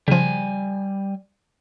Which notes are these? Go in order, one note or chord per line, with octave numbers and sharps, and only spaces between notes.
C#3 F3 G3 G#5